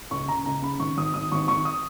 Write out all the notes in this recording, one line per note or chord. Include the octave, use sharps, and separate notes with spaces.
C#2 C#6
C#2 A#5
C#2 A#5
C#3 B5
G#1 C#6
G#1 D#6
G#1 D#6
G#1 C#6
G#1 C#6
D#6